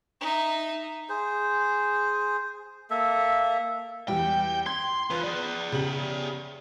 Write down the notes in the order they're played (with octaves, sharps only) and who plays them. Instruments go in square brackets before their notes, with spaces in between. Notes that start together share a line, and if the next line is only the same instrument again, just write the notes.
[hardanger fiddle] D#4 E5
[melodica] G#4 C5
A#3 A4 E5
[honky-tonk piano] E2 G3 [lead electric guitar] G5
[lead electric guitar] C6 [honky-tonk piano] G#6
[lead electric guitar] E3 F4 [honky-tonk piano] B4 F#6
[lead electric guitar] G#4 D5
[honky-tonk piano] C#3 G4 F#7